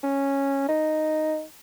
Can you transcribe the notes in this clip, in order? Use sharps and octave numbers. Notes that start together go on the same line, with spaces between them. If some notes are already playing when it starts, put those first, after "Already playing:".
C#4
D#4